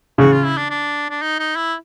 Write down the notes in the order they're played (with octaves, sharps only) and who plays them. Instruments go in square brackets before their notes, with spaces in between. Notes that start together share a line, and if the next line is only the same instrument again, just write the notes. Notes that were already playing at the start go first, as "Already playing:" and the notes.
[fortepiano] C#3 [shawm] F#4
[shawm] F4
E4
D4
D4
D4
D#4
D#4
E4